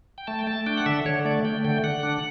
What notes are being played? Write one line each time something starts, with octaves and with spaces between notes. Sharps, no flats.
G5
A3 A5
G5
A3 A5
D4 G5
F#5
D3 E5
D3 C#5
A3 D5
A3 G5
D3 G5
D3 F#5
D4